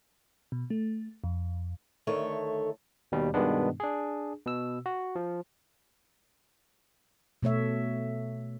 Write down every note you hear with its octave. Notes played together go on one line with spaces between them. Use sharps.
B2
A3
F2
D2 D#3 A3 A4 C#5
D#2 B2 G3
G2 B2 D#3 G#3 B3 D4
D4 G#4
B2 E6
F#4
F3
B2 A3 C#5 E5